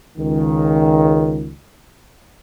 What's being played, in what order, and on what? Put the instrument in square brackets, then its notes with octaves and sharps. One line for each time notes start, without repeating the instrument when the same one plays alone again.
[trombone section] C#2 D#3